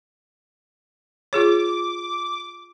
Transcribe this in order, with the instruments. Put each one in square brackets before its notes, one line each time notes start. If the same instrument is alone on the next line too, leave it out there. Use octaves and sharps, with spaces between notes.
[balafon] F4 G#4 C#5 [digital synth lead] D6